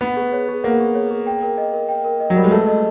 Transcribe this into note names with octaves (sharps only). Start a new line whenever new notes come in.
B3 F#5
G#4
C#5
G#4
A#3 F#5
G#4
C#5
G#4
G5
A#4
D#5
A#4
G5
A#4
D#5
F#3
G3 A#4
G#3
A3 B4
D#5